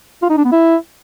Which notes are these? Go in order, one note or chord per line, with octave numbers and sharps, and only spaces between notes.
F4
D#4
D4
B3
E4